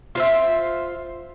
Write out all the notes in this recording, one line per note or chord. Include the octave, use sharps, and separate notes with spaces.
F4 C5 E5